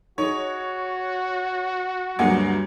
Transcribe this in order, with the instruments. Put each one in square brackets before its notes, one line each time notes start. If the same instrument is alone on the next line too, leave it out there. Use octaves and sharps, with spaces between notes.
[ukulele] D#4 G#4 [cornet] F#4 [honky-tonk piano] C#5
[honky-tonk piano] D2 A#3 [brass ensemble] G2 F#3 [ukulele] G#4 F#5 G#5